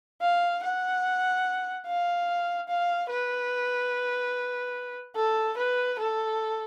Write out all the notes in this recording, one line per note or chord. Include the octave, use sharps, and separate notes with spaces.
F5
F#5
F5
F5
B4
A4
B4
A4